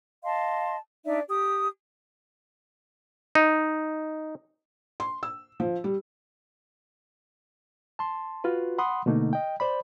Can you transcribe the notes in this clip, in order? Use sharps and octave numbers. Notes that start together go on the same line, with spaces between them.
D#5 F5 A5 C6
D4 D#4 D5 E5
G4 D#6
D#4
C6
E6
F3
G3
A5 C6
F4 F#4 B4
F#5 B5 C6 D#6
B2 D3 A3 A#3 D#4
D#5 G5
C5 D5 B5